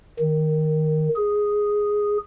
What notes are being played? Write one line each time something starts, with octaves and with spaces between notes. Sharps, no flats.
D#3
G#4